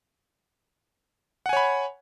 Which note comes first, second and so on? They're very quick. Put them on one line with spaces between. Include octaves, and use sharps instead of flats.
F#5 G#5 C#5 B5